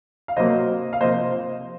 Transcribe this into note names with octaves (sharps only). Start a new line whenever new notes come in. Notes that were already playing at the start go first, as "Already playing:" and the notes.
F5
C3 F#3 A#3 C5 D#5
F5
C3 F3 A#3 C5 D#5